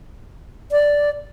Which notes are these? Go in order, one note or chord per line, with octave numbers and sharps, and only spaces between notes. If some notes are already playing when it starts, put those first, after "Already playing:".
D5